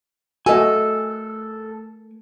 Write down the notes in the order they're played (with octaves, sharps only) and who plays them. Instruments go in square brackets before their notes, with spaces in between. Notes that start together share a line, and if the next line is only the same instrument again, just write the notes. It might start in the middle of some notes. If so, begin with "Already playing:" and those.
[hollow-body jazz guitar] A3 A#4 G#5 [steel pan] F#4 D#5 [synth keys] A4